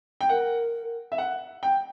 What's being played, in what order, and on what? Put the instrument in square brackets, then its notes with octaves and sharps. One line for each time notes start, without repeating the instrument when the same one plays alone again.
[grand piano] G5
[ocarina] A#4 [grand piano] F#5
[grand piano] E5
F#5
G5